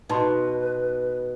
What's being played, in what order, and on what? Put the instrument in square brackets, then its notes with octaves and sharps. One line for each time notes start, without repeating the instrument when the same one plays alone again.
[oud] B2 [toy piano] D#4 A5 C6 [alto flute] B4